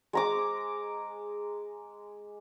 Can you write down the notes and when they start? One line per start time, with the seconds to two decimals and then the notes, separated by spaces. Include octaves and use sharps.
0.13 G#3 A#5 D6